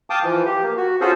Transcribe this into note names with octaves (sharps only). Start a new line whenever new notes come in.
F5 G5 A5 D6 D#6
E3 F3
G4
A#3
F#4
C#4 F4 F#4 G#4 A4 C5